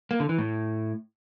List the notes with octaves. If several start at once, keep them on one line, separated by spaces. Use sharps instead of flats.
A#3
D3
E3
A2